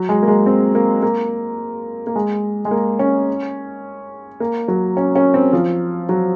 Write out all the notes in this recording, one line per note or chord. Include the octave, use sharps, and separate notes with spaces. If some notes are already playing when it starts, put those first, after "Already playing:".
Already playing: F#3
G#3
A#3
G#3
C4
A#3
A#3
A#3
G#3
G#3
A#3
C#4
A#3
F#3
C#4
C#4
C4
F3
F#3